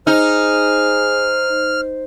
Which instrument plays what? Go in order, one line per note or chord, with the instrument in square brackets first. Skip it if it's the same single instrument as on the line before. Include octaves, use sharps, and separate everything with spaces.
[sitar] D#4 [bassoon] G#4 [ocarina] C5 [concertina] F6